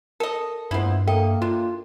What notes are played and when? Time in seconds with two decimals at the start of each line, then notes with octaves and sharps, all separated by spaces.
0.20 A4 A#4 D#5
0.71 G2 A#2 G#3 B3 C4 E4
1.07 A#3 A4 D#5 E5 G5
1.42 D4 F4